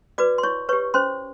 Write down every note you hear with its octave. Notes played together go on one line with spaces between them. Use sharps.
F#4 B4 D5 D6
C6
E4 C#5 C#6
G4 B4 C#5 C#6
C#4 C5 C6